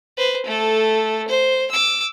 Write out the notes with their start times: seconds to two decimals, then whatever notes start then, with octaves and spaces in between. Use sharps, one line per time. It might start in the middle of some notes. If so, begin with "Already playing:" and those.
0.17 B4 C5
0.46 A3 A4
1.28 C5
1.71 D6 E6